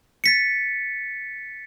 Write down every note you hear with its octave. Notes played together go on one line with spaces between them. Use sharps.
A6 B6 C#7